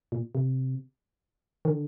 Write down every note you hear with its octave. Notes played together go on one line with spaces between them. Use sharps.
A#2
C3
D#3
D3